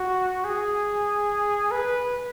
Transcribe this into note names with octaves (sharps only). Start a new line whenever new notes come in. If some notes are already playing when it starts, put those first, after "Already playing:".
Already playing: F#4
G#4
B4